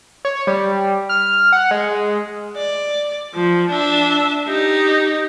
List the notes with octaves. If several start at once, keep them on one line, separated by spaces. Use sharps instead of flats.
C#5
G3
F6
F#5
G#3
D5
F3
D4 E5
D#4 G4